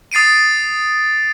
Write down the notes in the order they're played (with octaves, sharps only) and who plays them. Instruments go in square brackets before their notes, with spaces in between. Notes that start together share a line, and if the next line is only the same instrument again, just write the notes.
[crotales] D#6 A6 C7 D7 D#7